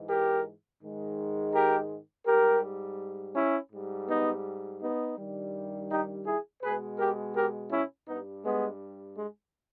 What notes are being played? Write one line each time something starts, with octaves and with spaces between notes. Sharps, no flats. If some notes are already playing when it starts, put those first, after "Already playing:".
Already playing: G#2 E3 G#3
G4 A#4
G#2 D#3 G#3
G4 A#4
G#2 G3 G4 A#4
C#4 E4
G#2 G3
B3 D#4
B3 D#4
G2 D#3 G3
D#4 G4
E4 G#4
B2 G#3 G#4 B4
G4 A#4
G4 A#4
C#4 E4
G2 G3 B3 D#4
G#3 B3
G#3